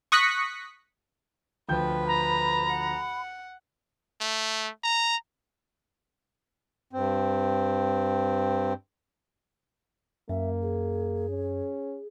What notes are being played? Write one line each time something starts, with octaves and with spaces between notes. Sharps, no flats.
C#6 D#6 F#6 A#6 B6 C#7
D2 F3 B4 G5 G6
A#5 B5
F#5
A3
A#5
G2 C4
F#2 A#3 E5
G#4
C#4